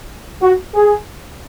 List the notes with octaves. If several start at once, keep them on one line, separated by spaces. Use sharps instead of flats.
F#4
G#4